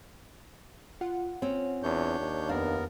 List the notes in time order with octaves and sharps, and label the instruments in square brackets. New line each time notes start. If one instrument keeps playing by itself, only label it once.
[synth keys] F4 F#5
[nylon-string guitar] C4 C#4
[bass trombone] E2 [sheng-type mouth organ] D4 C#5 G6
[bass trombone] D#2
[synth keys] F2 F5 [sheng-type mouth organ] B3 A#4 [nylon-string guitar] D4